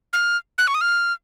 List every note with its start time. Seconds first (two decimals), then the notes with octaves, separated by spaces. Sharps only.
0.13 F6
0.58 F#6
0.67 C#6
0.75 D#6
0.81 F6